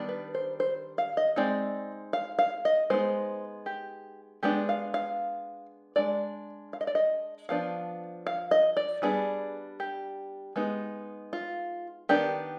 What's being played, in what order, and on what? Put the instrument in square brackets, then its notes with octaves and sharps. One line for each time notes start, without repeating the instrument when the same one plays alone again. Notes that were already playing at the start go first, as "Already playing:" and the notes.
Already playing: [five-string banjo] D#3 G3 B3 D4
B4
C5
C5
F5
D#5
G#3 C4 D#4 D5
F5
F5
D#5
G#3 B3 D#4 C5
G4
G#3 B3 D4 G4
F5
F5
G#3 D4 D5
F5
D#5
D5
D#5
F3 B3 D4 F5
F5
D#5
D5
G3 B3 D4 G#4
G4
G#3 B3 D#4
F4
D#3 B3 D4 G4